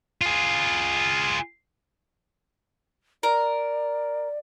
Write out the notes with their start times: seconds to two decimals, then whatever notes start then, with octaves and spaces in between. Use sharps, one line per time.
0.21 F4 G#4
3.23 A#4 D5